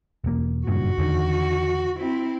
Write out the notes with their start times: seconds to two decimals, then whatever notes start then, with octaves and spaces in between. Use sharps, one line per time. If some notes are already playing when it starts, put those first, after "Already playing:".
0.24 E1 A#3
0.67 F#1 G2 A#2 F#4
0.98 E2 D3 D#3
1.98 C4 E4